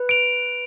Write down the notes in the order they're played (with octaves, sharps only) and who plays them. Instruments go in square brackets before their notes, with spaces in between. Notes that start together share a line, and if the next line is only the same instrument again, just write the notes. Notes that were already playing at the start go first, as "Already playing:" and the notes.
Already playing: [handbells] B4
[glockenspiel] D7 F7